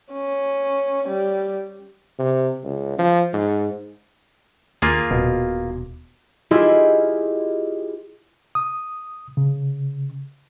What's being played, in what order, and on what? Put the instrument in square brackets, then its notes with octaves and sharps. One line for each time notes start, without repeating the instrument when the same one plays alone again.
[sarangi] C#4
G3
[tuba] C3
C#2
F3
G#2
[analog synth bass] D#2 [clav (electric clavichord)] A#3 F4 G#4
[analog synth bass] D#1 [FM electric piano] B2
[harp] E4 F4 G4 G#4 D#5 E5
[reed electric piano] D#6
C#3